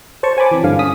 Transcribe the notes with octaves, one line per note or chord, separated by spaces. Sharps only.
C5 C#5 A5 C#6
C5 G#5 A5 B5 D6
E3 C4
G2 D3 F5
C#4 D#6 B6